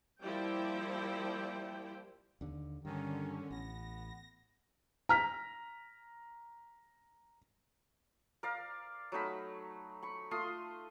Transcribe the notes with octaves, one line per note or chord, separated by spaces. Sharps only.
F3 G3 A#3 E4 G5
D#2 D3
G2 D3 D#3 C#4
A1 B3 A#6
A#5 F6 B6
A#4 D5 F5
F#3 A3 D#4 B5
B5 C#6
A3 F4 C6 D#6